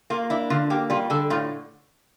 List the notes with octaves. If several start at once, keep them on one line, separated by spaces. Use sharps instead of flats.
A#3 F4
D4 E4
D3 F4
A#3 G4
G3 F4
D3 A4
A2 F4